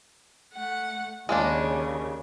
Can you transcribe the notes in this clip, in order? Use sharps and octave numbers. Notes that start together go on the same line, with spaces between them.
A3 F#5
D#2 C#3 G#3 A#3 D4